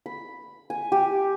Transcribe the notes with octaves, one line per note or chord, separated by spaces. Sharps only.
B5
G#5
G4